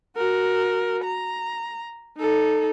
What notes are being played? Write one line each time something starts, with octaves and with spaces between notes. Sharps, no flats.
F#4 A#4
A#5
D#4 A4